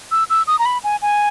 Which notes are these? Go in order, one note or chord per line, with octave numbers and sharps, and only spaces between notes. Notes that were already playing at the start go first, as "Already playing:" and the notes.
E6
E6
D#6
A#5
B5
G#5
G#5